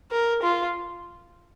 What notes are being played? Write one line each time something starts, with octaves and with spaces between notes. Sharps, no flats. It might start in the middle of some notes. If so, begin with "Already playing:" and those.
A#4
F4